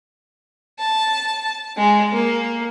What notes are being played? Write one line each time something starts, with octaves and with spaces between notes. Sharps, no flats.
A5
G#3
A#3